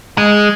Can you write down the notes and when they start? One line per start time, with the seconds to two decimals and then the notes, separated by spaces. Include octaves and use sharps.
0.18 G#3